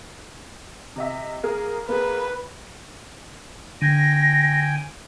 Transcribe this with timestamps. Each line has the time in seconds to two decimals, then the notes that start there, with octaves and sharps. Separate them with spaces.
0.96 C3 D#5 E5
1.43 A#3 G#4 A#4
1.89 A#3 G#4 B4
3.82 D3 G5 G#5 A#6